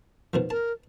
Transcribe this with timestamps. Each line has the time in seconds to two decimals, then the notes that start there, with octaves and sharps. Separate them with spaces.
0.34 B2 D#3 F3
0.50 A#4 A5